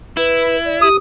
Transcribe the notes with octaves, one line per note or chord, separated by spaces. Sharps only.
E4 B4
D5
G4 D#6